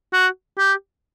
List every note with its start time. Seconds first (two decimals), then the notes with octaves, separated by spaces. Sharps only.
0.13 F#4
0.58 G4